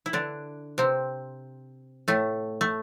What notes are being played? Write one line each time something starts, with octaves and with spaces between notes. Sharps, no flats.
E4
D3 D4
C3 C4
A2 A3
A3